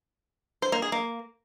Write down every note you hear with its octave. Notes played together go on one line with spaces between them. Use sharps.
C5
A#3
G#4
A#3